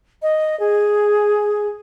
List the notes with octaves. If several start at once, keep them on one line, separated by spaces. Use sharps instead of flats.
D#5
G#4